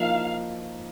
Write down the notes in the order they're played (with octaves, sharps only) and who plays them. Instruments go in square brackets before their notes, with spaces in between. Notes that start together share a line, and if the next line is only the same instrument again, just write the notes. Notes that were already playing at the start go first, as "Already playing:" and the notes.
Already playing: [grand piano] F3 A#3 D#4 [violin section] F5